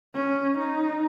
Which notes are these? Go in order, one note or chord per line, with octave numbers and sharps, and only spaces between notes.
C#4
D#4